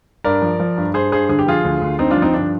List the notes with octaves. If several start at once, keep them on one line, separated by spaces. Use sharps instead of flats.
G2 A#4 D5
F3
F3
G2
G2 G#4 C5
G2 G#4 C5
D3 G#4
G4
F3 F4 G#4
D2
D2
D3 C4 D#4
D4 F4
F3
C4 D#4
G2 D4